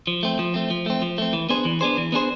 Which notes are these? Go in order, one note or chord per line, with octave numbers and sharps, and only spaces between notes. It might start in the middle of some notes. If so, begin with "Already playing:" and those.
F3
A3 C4
F3
A3 C4
F3
A3 C4
F3
A3 C4
E3
B3 D4 G#4 C5
E3
B3 D4 G#4 C5
E3
B3 D4 G#4 C5